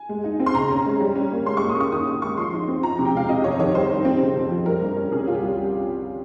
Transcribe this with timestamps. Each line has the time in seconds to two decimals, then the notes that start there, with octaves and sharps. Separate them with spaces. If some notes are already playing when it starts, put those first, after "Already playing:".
Already playing: G#5
0.09 G#3
0.24 D#4
0.40 C4
0.46 C6
0.55 C#3 A#5
0.70 C#4
0.86 G#3
1.00 G3
1.16 C#4
1.31 A#3
1.46 G#3 C6
1.57 C#6
1.61 A#2
1.69 D#6
1.76 C#4 C#6
1.92 D#3 D#6
2.07 C#4 D#6
2.22 G#3 C#6
2.37 F3 C6
2.53 D#4
2.68 C4
2.83 F3 A#5
2.99 C3
3.05 G5
3.14 G#3 F5
3.29 C3 D#5
3.44 F2 C#5
3.59 D#3 C#5
3.74 G3 C5
3.90 D#4
4.05 C4
4.21 C#3
4.36 F2
4.50 F3
4.66 G3 A#4
4.81 G2
4.97 C#4
5.11 C3 G#4
5.27 C2 F4
5.34 G4
5.42 G3